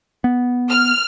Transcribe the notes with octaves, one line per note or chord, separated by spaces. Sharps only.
B3
F6